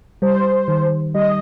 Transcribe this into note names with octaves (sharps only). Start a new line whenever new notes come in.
G3 C5
D#3
G3 D#5